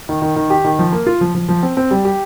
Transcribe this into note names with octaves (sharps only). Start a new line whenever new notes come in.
D#3
D#3
D#3
G4
D#3
F3
A#3
F4
F3
F3
F3
C4
C4
G3
G4